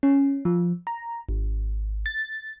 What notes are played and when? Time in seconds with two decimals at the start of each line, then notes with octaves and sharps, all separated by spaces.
0.03 C#4
0.45 F3
0.87 A#5
1.29 G#1
2.06 A6